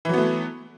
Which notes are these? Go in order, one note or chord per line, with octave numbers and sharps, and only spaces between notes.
E3 F#3 A3 B3